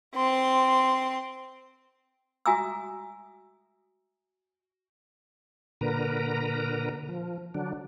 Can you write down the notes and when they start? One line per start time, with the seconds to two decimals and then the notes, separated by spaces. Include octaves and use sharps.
0.15 C4 C6
2.46 F#4 E5 G#5 A#5 D#6 E6
5.81 A#2 D3 A#4 B4 A#5
7.09 F3
7.54 D3 F#3 D4